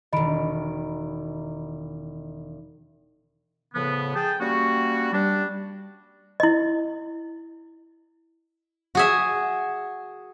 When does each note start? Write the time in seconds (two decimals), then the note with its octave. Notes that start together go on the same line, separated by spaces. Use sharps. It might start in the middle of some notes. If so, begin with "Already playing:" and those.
0.13 E1 D#3 D#5 B5 D7
3.74 A2 C#3 F3 B3
4.15 G#4 G5 A5
4.40 G3 A#3 C#4 F#4
5.12 G3 D4
6.40 E4 D#5
8.95 F#4 G#4 E5